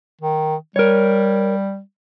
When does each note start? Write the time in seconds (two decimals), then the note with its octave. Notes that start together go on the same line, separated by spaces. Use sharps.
0.21 D#3
0.76 G3 A#4 C#5